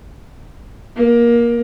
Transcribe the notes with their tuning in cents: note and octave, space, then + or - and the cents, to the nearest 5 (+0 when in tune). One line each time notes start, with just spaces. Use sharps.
A#3 +20